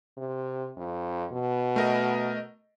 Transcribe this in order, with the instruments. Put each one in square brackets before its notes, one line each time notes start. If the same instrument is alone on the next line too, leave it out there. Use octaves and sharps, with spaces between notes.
[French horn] C3
F2
B2
[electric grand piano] A3 A#4 D#5